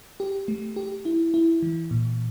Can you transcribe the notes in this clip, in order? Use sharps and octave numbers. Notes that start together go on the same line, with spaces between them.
G4
A3
G4
E4
E4
E3
A#2